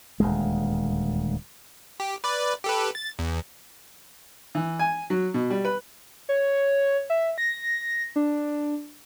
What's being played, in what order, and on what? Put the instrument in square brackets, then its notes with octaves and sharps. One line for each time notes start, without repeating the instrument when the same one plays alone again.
[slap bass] D#1 D2 G#3
[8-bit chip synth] G4
B4 D5
G4 A4 B4
A6
E2
[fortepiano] E3
G#5
F#3
B2
G3
B4
[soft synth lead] C#5
E5
A#6
D4